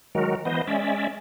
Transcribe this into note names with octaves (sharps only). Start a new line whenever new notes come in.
D#3 F#3 G#3 F#4 A#4
E3 B3 C5 D#5
G#3 C#4 D5 E5